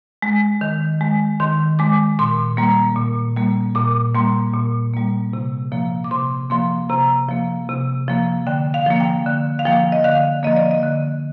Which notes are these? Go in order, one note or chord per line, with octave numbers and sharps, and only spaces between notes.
G#3
D#3
G#3
D#3 C6
G#3 D6
A#2 C6
G3 A#3 A#5
A#2
G3 A#3
A#2 D6
G3 A#3 C6
A#2
G3 A#3
C3
F3 A#3
D6
C3 C6
F3 A#3 C6
C3 A#5
F3 A#3
C3
F3 A#3
D3 G5
F5
F3 A#3
G5
D3
F5
F3 A#3 G5
D#5
D3 F5
F3 A#3 D#5
D5
D#5
D3